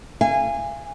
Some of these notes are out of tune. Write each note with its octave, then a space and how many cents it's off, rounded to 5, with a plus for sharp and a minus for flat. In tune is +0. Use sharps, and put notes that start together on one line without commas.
F5 -35 G#5 -15